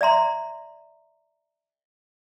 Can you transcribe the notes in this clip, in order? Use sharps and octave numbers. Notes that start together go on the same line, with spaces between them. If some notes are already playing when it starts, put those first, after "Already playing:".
D5 E5 A#5 C6